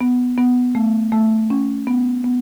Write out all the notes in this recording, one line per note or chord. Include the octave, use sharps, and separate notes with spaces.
B3
B3
A3
A3
C#4
B3
B3